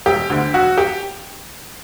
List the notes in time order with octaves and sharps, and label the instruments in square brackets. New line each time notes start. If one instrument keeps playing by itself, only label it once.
[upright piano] E1 G4
D2 D3
E1 F#4
G4